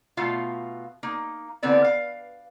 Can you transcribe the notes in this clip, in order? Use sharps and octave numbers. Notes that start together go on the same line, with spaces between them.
B2 A3 F4 F5
A#3 D#4
D3 E3 B3 C4 D5
F5